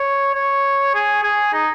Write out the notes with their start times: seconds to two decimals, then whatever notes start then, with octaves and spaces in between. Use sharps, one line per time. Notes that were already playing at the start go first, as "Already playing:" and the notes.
Already playing: C#5
0.34 C#5
0.94 G#4
1.23 G#4
1.53 D#4